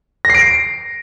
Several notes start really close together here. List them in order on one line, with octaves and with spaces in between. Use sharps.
A#6 C7 D7